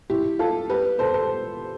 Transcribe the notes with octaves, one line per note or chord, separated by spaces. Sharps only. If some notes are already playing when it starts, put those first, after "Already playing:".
E4 G4
F4 A4
G4 B4
A4 C5
A4 C5